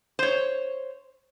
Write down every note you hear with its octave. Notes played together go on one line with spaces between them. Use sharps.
C5 C#5